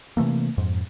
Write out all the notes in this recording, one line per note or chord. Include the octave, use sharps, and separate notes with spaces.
C3 E3 A3 A#3
F2 G#2